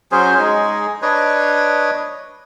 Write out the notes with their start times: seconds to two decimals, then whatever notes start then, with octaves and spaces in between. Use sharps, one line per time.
0.12 F#3 C#4 G#4 C5
0.38 G#3 D#4 G#4
1.02 D4 B4 C#5 D#5